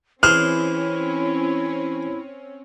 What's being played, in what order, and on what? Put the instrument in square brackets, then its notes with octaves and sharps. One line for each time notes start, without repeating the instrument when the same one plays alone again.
[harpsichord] E3 G#4 C5 [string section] C4 C#4 C#5 [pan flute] E4 [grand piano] F6